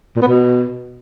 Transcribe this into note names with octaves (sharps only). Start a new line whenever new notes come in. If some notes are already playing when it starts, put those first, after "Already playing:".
A#2
B3
B2